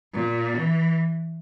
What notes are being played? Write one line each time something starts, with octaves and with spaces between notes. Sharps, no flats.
A#2
E3